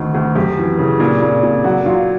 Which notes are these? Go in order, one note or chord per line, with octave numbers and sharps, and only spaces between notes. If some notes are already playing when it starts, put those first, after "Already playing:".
Already playing: D2 D#3
D2
F#2 G4
E3
C#3
A#2
A#2
A#2
F#3 F#4
F#3 F4